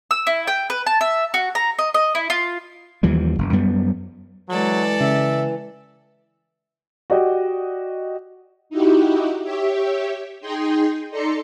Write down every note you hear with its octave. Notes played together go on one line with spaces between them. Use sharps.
E6
E4
G5
B4
A5
E5
F#4
A#5
D#5
D#5
E4
F4
D#2 E3 F3 G3
F#1
F#2 G3 B3
E3 F#3 G#3 A4 D5
C#3 E5
F#4 G4 D5 D#5
D#4 E4 F#4 G4
G4 C#5 E5
D#4 G#4 G5 C6
D#4 A4 D5 A#5 C6 C#7